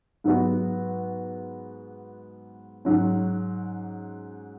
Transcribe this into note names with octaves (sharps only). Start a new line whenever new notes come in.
G#2 F#3 B3 F#4
G#2 F#3 C#4